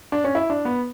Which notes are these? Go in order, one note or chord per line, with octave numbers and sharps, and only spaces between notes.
D4
C#4
E4
D4
B3